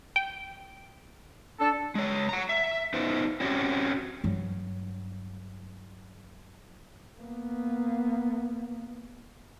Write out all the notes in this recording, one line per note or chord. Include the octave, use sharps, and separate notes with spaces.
G5
D4 A4
G#3 C#5
F#5 A#5
E5
B3 D#4 B4 C5
C4 C#4 F#4 G4 C5
G2 F#3
A#3 B3